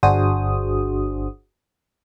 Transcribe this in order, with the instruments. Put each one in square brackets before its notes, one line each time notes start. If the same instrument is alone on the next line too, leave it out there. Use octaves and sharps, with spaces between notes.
[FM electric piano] G1 D4 F#4 G#4 C5 D#6